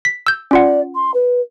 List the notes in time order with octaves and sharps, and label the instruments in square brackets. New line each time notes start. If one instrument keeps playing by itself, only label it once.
[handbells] B6
E6 G6
[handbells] C#4 F4 F#5 [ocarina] D5
[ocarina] C6
B4